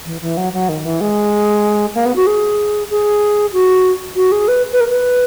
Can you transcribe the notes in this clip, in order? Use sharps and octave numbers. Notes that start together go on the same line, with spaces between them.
E3
E3
F#3
F#3
D#3
E3
G#3
A#3
B3
F#4
G#4
G#4
F#4
F#4
G#4
B4
B4
A#4
B4